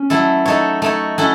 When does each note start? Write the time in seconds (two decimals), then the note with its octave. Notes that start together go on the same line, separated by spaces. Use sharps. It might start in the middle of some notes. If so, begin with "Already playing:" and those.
Already playing: C#4
0.10 F#3 A3 E4 A4
0.46 A3 D#4 A4 C#5
0.82 A3 D#4 A4 C#5
1.18 F#3 C#4 E4 A4